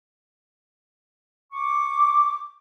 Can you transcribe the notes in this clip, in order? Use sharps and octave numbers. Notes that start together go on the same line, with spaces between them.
C#6 D6